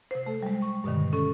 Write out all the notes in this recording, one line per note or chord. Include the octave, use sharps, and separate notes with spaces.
C3 C5
A3 A4
G3 G#3
C#6
G2 B2 D3 D#3
C#4 A4 C#6